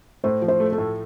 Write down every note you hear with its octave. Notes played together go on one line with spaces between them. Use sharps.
A2 C5
F3
C5
A3
A4
A2